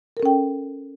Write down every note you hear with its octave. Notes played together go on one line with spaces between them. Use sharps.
C#4 A4 A#4 G5